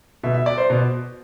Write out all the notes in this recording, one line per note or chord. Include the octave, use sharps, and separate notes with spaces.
B2 E5
E5
D5
C5
B2